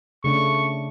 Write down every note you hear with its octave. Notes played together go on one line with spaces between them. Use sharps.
C#3 A3 D4 C#6